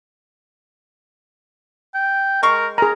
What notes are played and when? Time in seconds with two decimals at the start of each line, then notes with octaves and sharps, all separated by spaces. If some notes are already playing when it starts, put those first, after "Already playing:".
1.94 G5
2.43 G#3 A#4 C#6
2.78 G#4 A#4 A#5